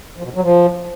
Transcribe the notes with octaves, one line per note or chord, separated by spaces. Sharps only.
F3
B2
E2
F#3
F3